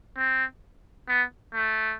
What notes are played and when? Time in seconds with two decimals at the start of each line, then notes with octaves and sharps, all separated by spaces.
0.17 C4
1.09 B3
1.54 A3